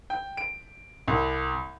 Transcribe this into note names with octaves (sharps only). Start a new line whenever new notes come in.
G5
D7
C2